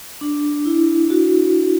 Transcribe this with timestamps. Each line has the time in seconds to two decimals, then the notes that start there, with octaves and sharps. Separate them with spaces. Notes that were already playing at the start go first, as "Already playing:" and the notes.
0.21 D4
0.65 E4
1.10 F#4